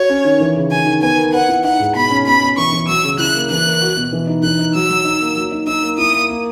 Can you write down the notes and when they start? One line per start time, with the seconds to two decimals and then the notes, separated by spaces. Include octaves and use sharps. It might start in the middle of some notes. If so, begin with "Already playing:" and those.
Already playing: F#4 C#5
0.10 C#4
0.25 D#3
0.40 E3
0.56 C#3
0.71 D#3 G#5
0.86 D#3
1.02 B3 G#5
1.17 A#4
1.33 B4 F#5
1.48 E4
1.64 D#4 F#5
1.80 G#2
1.95 B2 B5
2.11 C#4
2.26 B2 B5
2.42 B2
2.57 E3 C#6
2.72 E3
2.88 F#3 E6
3.03 C#3
3.18 E4 F#6
3.34 A#3
3.50 E3 F#6
3.65 A#4
3.82 F#4
3.97 B2
4.12 E3
4.27 D#4
4.43 E3 F#6
4.59 D#4
4.74 F#3 E6
4.89 F#3
5.05 D#4
5.20 A#3
5.36 F#3
5.51 D#4
5.67 D#4 E6
5.82 A#3
5.98 E4 D#6
6.13 A#3
6.29 A#3